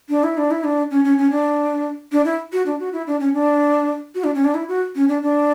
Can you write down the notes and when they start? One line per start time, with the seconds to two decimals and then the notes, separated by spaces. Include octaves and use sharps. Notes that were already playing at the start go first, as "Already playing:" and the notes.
0.09 D4
0.24 E4
0.37 D4
0.51 E4
0.64 D4
0.91 C#4
1.04 C#4
1.18 C#4
1.31 D4
2.12 D4
2.25 E4
2.53 F#4
2.66 D4
2.80 F#4
2.93 E4
3.07 D4
3.20 C#4
3.34 D4
4.15 F#4
4.24 D4
4.35 C#4
4.45 D4
4.55 E4
4.68 F#4
4.96 C#4
5.08 D4
5.22 D4